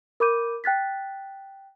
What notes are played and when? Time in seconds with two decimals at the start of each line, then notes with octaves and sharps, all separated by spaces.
0.20 A#4 B5 D6 G6 D#7
0.64 G5 F#6 A6 B6